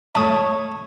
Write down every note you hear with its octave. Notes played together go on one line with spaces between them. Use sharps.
A3 E4 C#5 E5 A5 D#6